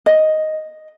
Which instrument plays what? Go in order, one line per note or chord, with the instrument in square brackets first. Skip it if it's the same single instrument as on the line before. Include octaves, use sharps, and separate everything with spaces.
[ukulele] D#5